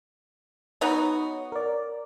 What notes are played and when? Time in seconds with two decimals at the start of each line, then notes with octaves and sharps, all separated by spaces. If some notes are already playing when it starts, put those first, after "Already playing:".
0.81 B3 D#4 F#4 C#5 D#5
1.52 A#4 D5